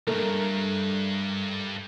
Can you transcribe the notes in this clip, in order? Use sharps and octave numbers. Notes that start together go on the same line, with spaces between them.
C2 G2 A3 A#4